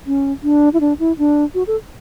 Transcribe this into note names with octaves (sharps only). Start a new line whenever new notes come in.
C#4
D4
E4
D4
E4
D4
F#4
A4